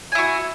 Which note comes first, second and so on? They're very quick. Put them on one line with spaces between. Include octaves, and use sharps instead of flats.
G#5 E4 F#4